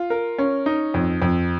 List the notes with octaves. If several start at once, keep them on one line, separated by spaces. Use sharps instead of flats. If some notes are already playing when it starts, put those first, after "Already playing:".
Already playing: F4
A#4
C#4
D#4
F2
F2